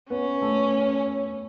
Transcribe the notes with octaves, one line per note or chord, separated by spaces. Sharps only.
B3 C#4
A3